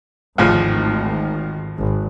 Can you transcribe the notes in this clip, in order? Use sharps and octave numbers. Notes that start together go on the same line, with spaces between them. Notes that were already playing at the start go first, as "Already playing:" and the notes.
G#1 D2 A2 D#3 F3
G#1